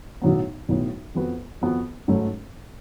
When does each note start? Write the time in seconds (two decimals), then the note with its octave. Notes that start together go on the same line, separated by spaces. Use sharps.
0.22 B1 A2 F#3 B3
0.68 B1 A2 F#3 B3
1.15 F2 F3 B3 F#4 B4
1.61 F2 F3 B3 F#4 B4
2.08 G#2 F#3 A3 C#4